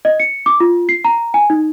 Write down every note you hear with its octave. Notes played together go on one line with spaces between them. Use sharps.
D#5
C#7
D6
F4
C7
A#5
G#5
D#4